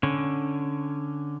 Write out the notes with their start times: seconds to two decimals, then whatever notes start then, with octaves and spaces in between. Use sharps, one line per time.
0.03 D3 C#4